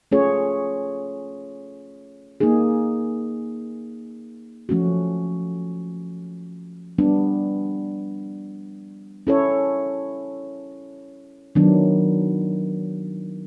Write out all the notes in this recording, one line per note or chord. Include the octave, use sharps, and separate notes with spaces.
A3 C#4 F4 G#4 C#5
A#3 D#4 G#4
F3 A3 C#4 F#4
G3 B3 D4
C#4 E4 A4 C#5
D#3 F#3 B3 D4